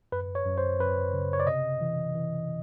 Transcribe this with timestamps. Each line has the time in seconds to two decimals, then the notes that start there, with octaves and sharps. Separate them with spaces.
0.12 F#2 B4
0.35 C#5
0.46 F#2
0.58 C5
0.79 F#2 B4
1.14 C#3
1.33 C#5
1.40 D5
1.47 C3 D#5
1.81 E3
2.15 E3